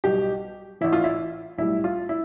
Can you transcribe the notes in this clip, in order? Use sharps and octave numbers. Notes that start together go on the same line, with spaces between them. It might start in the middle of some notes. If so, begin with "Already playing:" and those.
B1 B2 G3 G4
A1 A2 E3 E4
F4
E4
B1 A2 G3 E4
F4
E4